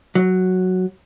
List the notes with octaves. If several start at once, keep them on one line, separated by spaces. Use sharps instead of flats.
F#3